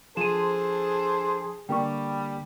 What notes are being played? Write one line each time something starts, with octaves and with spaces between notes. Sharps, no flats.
F3 D4 G#4 A4 C5 D#7 E7
D3 G3 A#3 D4 G5 C#6